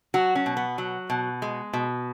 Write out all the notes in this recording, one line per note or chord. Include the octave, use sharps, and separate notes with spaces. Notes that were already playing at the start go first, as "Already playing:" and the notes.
F#3 F#4
C#4
B2
B3
F#3
B2
G#3
B2